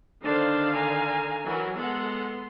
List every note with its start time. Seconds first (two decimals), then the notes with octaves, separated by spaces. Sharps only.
0.24 D3 D#3 D4 C5 F5
0.76 G#5 A#5
1.44 E3 F#3 A#4
1.76 G#3 B3 A4 F#5 C6